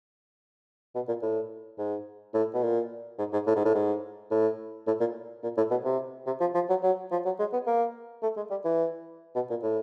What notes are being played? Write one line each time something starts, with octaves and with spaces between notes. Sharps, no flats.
B2
A#2
A2
G#2
A2
B2
A#2
G#2
G#2
A2
G#2
A2
G#2
A2
A2
A#2
A#2
A2
B2
C3
C3
F3
F3
F#3
F#3
F3
F#3
G#3
B3
A#3
A3
G#3
G3
E3
B2
A#2
A2